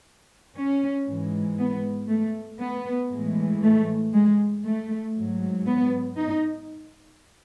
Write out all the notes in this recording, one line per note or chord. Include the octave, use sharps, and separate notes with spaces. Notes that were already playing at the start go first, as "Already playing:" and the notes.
C#4
G#2 E3 G#3
B3
A3
B3
A2 E3 G#3
A3
G#3
A3
G#2 F#3
B3
D#4